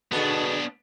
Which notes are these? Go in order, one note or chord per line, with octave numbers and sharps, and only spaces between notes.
B2 D3 B3 D4 G#4 A4